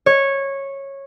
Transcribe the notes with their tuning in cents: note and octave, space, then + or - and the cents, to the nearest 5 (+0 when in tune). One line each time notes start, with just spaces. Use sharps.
C#5 -15